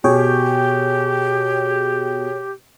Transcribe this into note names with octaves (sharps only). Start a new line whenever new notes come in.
B2 G4 G#4 C#5 G5